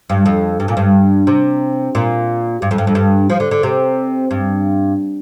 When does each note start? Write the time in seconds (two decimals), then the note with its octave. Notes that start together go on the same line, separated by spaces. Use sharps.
0.10 G2
0.26 F2
0.60 G2
0.68 A#2
0.77 G2
1.27 C3
1.95 A#2
2.62 G2
2.71 F2
2.78 G2
2.87 F2
2.95 G2
3.30 F3
3.40 D3
3.51 D3
3.63 C3
4.31 G2